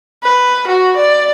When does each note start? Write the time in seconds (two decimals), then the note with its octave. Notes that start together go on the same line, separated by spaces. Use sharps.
0.23 B4
0.68 F#4
0.97 D5